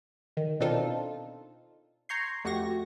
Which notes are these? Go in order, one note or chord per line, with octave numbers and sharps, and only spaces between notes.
D#3
B2 C4 D4 D#4 F4 A4
A#5 C6 C#6 G6 G#6 C7
F2 A3 F#4 G4 C#6 A#6